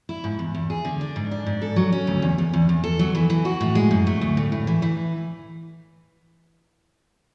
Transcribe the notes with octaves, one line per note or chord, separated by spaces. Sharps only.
E4
G#2
E2
E2
G#4
D3
D4
G#2
D4
G#2
A4
F#3
C#4
D2
E2
E2
E2
E2
A4
F#3
E3
E3
F#4
A2
G#3
F#2
A3
D2
A2
A2
E3
E3